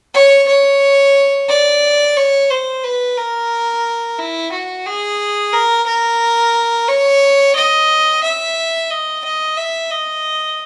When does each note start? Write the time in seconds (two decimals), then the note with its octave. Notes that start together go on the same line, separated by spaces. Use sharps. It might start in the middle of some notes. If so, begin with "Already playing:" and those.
0.14 C#5
0.48 C#5
1.49 D5
2.17 C#5
2.50 C5
2.83 B4
3.17 A#4
4.19 E4
4.52 F#4
4.86 G#4
5.53 A#4
5.86 A#4
6.88 C#5
7.56 D#5
8.23 E5
8.90 D#5
9.24 D#5
9.57 E5
9.91 D#5